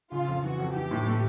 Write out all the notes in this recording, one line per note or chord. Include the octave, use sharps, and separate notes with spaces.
C#3 F4
F2
E3 F#4
F2
E3 G4
A2
A3